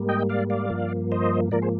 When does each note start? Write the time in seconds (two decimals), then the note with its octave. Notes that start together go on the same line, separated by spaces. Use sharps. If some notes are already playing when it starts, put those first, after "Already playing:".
Already playing: G#2 G3 A#3
0.09 D#5 G5
0.29 D5 F5
0.50 D5 F5
0.70 G2 F3 A#3
1.12 C5 D#5
1.51 G#2 F3 A#3 A#4 D5
1.62 G#4 C5